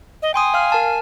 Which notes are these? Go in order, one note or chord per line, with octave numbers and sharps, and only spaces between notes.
D#5
G5 G#5 C6 D#6
F5 F6
A#4 A5 F6